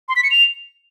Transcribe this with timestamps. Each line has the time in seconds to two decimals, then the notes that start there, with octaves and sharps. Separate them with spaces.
0.09 C6
0.16 B6
0.23 C#7
0.31 F7